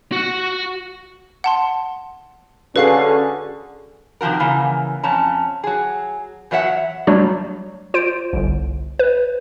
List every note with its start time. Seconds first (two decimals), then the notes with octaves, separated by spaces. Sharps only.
0.12 F#4 F#5
1.44 F#5 A5 C6
2.76 D3 C#4 F#4 G#4 A4 B4 F5 C7
4.21 C3 D#3 F3 F#4 A#4
4.40 C#3 E3 A#3
5.03 F2 C#4 A5 A#5
5.64 F#3 G#4
6.51 E2 F#3 C#5 E5 F#5
7.07 F#3 G3 A3 D4 F#4 C#5
7.94 F4 C5 D7
8.33 G1 C2
8.99 B4